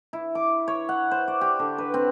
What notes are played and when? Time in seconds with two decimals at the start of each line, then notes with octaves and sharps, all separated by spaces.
0.13 E4
0.35 D6
0.68 C#5
0.89 F#5
1.11 C5
1.28 D5
1.41 G4
1.59 D3
1.78 B4
1.94 C4